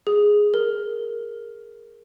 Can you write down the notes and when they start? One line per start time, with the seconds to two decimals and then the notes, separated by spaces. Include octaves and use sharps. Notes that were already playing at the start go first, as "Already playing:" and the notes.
0.07 G#4
0.54 A#4